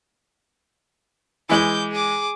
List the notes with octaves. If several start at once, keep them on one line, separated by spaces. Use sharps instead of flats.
E3 G#3 D6 G6
G#4 D6